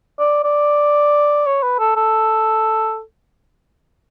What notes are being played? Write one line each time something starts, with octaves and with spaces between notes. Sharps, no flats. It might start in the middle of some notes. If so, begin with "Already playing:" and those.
D5
D5
C#5
B4
A4
A4